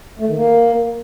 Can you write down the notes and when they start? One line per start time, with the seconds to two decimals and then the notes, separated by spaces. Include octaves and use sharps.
0.19 A3
0.28 D#3
0.37 A#3